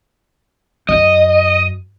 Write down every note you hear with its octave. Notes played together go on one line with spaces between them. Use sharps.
F#2 D#5